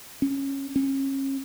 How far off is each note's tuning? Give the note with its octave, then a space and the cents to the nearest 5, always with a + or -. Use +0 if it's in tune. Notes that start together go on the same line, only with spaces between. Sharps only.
C#4 -15
C#4 -35